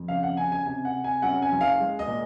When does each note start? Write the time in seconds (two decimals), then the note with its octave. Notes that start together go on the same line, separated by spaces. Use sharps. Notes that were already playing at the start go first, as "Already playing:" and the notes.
Already playing: F2
0.08 C#3 F5
0.23 F#5
0.37 C#3 G#5
0.52 G#5
0.66 C3 G#5
0.85 F#5
0.95 C3
1.04 G#5
1.22 F#2 F#5
1.42 G#5
1.52 F#1
1.61 F5
1.80 G#3
1.99 D#5
2.08 A#2